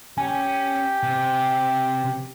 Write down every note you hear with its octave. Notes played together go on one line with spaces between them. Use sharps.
C#4 G4 G#5
C3